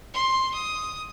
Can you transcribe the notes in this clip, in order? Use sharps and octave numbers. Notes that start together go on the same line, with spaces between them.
C6
D#6